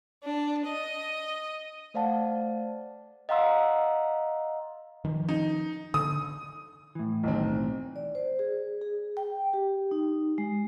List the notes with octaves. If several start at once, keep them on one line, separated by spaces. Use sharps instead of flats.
D4
D#5
A3 C5 D5 F5 F#5 A5
D#5 F5 F#5 A#5 C6 E6
D#3 F3
D#4
D3 D#6
A2 E3
B1 D#3 C4
D5
C5
G#4
G#4
G5
G4
D#4
G#3